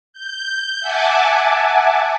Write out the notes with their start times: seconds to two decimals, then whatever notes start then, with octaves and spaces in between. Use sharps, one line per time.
0.13 G6
0.81 E5 F#5 G#5 A5 D6